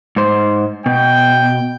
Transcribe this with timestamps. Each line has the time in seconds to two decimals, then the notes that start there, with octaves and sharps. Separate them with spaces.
0.16 G#2 C5
0.86 B2 G5